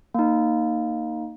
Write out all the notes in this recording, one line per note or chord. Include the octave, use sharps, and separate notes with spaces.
A#3 D#4